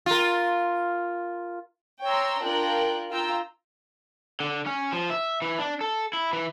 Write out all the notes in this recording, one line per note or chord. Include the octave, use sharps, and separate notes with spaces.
F4 A#4
C#5 G5 A#5 C6 E6
D4 F4 A#4 G5 F#6
F4 G5 A#5 E6
D3
C#4
F3
E5
E3
D4
A4
E4
E3